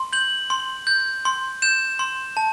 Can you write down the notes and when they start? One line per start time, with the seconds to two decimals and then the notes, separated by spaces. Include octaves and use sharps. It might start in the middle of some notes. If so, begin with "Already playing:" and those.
Already playing: C6
0.13 G6 F#7
0.50 C6
0.87 G6
1.25 C6
1.62 G6 E7
1.99 C6
2.37 A5